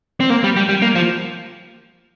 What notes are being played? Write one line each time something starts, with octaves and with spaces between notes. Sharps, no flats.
C4
A#3
G3
G3
G3
A#3
F3